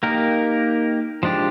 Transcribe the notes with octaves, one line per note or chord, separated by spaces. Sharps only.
A#3 D#4 G4 A#4
F3 G#3 D4 G4